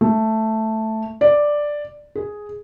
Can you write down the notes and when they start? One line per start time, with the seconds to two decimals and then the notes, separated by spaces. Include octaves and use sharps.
0.01 A3
1.21 D5
2.15 G#4